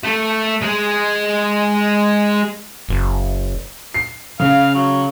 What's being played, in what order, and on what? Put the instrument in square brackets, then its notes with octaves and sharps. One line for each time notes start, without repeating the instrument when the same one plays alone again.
[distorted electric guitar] A3
G#3
[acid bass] F#1
[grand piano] C7
[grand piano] C#3 [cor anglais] F5
[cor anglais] F#3